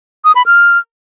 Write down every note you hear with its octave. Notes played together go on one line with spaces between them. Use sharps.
D#6
B5
F6